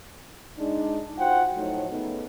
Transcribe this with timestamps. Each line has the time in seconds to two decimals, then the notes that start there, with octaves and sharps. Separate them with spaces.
0.58 G#3 D4 D#4
1.18 F4 F#4 C5 F#5 G5
1.55 A2 F3 F#3 A3 D#4
1.89 C#3 A3 B3 D#4